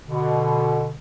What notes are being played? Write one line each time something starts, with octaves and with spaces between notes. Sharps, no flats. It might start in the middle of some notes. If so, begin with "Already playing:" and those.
B2 D3